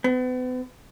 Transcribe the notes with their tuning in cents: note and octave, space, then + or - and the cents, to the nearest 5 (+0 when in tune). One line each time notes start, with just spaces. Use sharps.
B3 +40